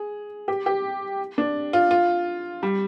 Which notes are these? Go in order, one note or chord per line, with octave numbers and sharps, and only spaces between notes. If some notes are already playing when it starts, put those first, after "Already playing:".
Already playing: G#4
G4
G4
D4
F4
F4
G3